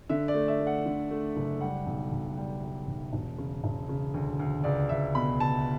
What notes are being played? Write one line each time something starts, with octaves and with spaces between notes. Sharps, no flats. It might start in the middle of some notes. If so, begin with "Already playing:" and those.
D3 E5
D5
A3
E5
A3
F#5
D3
A3
F#1
G3 F#5
B1
B1
G3
G3
B1
E1
C#3
E1
C#3
D2
D2
C#2 D5
C#2 E5
B2 B5
C#2 A5